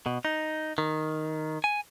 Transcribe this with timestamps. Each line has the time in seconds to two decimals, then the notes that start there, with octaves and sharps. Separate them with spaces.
0.06 B2
0.25 D#4
0.78 D#3
1.64 G#5